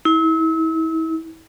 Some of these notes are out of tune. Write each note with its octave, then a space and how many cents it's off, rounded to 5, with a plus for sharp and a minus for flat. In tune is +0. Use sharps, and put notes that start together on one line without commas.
E4 -35